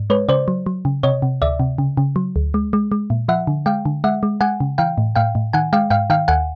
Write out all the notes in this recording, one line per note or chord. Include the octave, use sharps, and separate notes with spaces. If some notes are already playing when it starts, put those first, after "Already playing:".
Already playing: G#2
G#3 B4 C#5
C#3 C5 D5
F#3
F#3
C#3
C3 C#5 D#5
C3
D2 D5 E5
C3
C#3
C#3
F#3
D2
G#3
G#3
G#3
A#2
F3 E5 F#5
D3
G#3 F5 G5
D3
G#3 E5 F#5
G#3
G#3 F#5 G#5
C#3
E3 F5 G5
A2
A2 F5 G5
A2
D#3 F#5 G#5
G#3 F5 G5
G#2 F5 G5
D#3 F5 G5
D#2 F#5 G#5